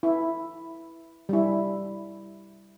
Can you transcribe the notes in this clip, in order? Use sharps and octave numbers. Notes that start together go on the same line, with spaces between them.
E4
G3 E4